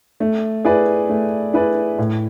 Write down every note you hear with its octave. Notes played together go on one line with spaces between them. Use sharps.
A3
E4 G#4 B4 D5
A3
E4 G#4 B4 D5
A2